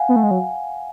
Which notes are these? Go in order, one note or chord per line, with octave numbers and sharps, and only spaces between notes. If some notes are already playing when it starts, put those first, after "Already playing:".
Already playing: F5 F#5 G#5
B3
A3
G#3
F#3